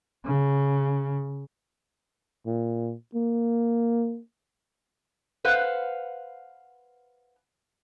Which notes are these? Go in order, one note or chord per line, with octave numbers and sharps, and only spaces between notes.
C#3
A#2
A#3
B4 C5 F5 F#5